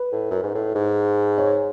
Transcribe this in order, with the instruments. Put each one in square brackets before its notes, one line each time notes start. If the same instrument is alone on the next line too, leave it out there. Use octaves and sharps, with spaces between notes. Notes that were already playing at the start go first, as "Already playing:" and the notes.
Already playing: [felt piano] B4
[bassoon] A2
F#2
G#2
A2
G#2
[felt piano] C#5